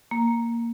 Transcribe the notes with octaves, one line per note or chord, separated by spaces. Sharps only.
A#3